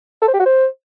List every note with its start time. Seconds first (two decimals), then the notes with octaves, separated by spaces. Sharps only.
0.22 A4
0.28 C5
0.34 G4
0.40 F#4
0.46 C5